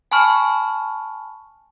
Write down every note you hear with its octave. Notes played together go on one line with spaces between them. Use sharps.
G#5 A5 B5 C#6 F6